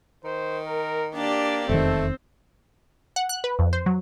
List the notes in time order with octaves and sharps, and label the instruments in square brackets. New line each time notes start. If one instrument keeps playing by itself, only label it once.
[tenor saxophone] D#3 [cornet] C5
[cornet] A#4
[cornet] A#3 [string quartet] D4 G4 D5
[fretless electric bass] E1 F2 D#3 [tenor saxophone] A3 [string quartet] C4 [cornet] A4
[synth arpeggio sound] F#5
F#6
B4
F2
C5
F#3